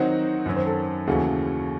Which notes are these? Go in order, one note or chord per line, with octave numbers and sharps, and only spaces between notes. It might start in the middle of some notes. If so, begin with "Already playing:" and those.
Already playing: D#3 F#3 C4 D#4 F#4 C5
F#2 D#3 F#3
C5
A4
D#2 C#3 E3 A3 C#4 F#4